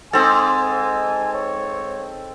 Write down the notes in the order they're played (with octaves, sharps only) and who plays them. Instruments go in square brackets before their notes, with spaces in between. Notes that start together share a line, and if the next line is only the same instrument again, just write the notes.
[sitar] G#2 [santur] C4 A4 [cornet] G#5
[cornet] C#5